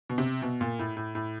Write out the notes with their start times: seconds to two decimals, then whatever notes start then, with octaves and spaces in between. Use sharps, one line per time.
0.10 B2
0.18 C3
0.42 B2
0.61 A#2
0.79 A2
0.97 A2
1.15 A2